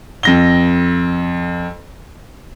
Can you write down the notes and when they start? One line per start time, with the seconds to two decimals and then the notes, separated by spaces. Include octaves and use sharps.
0.23 F2 A#6 G7